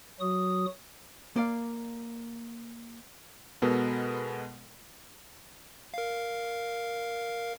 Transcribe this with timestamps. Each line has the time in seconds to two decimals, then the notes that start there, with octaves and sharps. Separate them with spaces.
0.21 F#3 F#4 D#6
1.36 A#3 D5 F5
3.62 B2 G#3 B3 A4 A#4
5.94 A#4 F5